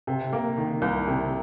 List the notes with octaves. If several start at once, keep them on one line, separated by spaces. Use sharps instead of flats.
C3
A#3
D#3
C2
C3